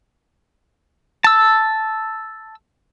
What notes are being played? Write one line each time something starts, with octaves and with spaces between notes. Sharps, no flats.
A5 E6